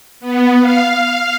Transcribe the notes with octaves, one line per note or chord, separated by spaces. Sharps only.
B3
F5